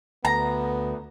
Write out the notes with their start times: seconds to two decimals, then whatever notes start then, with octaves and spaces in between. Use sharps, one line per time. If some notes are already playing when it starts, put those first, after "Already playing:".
0.25 D2 B3 A#5